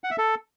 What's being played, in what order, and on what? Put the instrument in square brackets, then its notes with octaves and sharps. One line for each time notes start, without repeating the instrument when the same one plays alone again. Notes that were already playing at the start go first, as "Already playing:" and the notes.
[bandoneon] F#5
E5
A4